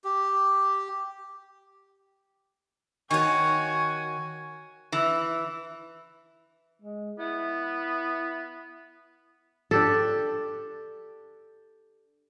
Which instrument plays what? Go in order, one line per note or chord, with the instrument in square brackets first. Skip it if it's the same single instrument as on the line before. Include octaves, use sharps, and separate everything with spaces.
[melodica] G4
[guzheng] D#3 C#5 [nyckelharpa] F#4 [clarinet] G#5 [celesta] C#6
[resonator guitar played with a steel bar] E3
[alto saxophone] G#3
[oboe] B3 [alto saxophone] E4
[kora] D4 G4 A4